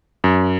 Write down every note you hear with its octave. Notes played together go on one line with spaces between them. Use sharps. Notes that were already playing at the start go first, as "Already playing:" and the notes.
F#2